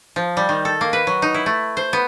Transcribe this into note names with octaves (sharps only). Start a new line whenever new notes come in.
F3
G3
D#3
A4
A#3
B4
F#3
D#4
E4
A3
C5
B3